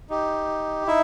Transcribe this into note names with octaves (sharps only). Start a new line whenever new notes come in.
D#4 G4
D#4 E4 E5